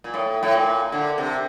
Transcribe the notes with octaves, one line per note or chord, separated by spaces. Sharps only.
A#2
A2
A2
A#2
D3
C3